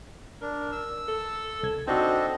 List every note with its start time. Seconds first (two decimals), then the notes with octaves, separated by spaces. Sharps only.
0.42 D4 A#4
0.72 E6
1.08 A4
1.63 C2 G#6
1.87 C4 D4 D#4 F#4 A4 D#5